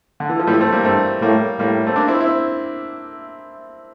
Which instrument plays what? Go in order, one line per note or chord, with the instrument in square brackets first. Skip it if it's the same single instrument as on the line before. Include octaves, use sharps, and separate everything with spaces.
[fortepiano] D3
E3
F3
[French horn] A2 [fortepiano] E3 G3
[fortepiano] A3 C4
G3 A#3
[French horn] G2 [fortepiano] A3 C4
[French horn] A2 [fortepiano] G3 A#3
[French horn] A2 [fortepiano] G3 A#3
[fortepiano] A3 C4
A#3 D4
C4 E4
C4 E4